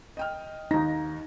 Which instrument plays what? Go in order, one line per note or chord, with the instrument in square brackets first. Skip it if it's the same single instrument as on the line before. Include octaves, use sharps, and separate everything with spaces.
[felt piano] D#5 G5 F6
[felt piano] D#2 A#6 [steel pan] D#4